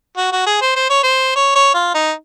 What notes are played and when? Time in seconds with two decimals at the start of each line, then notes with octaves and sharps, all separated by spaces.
0.17 F#4
0.32 F#4
0.46 G#4
0.62 C5
0.76 C5
0.90 C#5
1.03 C5
1.36 C#5
1.55 C#5
1.74 F4
1.94 D#4